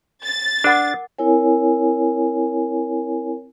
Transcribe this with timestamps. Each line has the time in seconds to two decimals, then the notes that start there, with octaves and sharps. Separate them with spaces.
0.24 A6
0.64 D4 A#4 F#5 D6
1.19 C4 E4 A#4 C#5 G#5